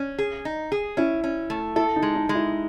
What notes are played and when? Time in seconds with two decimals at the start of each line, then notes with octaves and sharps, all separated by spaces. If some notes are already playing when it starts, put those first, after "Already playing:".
Already playing: C#4
0.19 G#4
0.45 D#4
0.72 G#4
0.97 C#4 E4
1.24 C#4
1.50 A3
1.76 E4 A4
1.96 D#4
2.03 G#3
2.15 D#4
2.29 G#3
2.35 E4